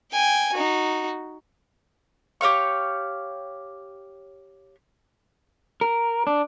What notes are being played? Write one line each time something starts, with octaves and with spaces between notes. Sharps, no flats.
G5 G#5
D#4 F#4
G4 C#5 F5 C#6
A#4
D4